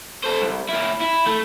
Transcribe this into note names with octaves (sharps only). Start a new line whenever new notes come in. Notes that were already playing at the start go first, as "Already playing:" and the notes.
A4 C5
C2
A#3 E4
E4
A3